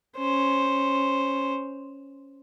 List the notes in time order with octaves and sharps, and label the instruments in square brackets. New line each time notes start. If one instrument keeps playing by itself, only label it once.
[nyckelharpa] C#4 C5